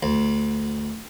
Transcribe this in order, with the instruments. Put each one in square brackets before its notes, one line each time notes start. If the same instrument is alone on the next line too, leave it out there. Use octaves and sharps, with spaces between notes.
[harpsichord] D2